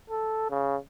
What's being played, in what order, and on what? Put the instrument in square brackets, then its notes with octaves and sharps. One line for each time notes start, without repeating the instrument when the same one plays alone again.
[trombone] A4
C#3